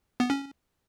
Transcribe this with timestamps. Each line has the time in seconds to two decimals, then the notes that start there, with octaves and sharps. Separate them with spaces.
0.20 B3
0.30 C#4